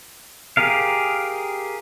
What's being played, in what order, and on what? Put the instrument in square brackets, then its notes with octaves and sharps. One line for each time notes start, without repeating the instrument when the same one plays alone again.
[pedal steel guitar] G4 G#4 A#4 F5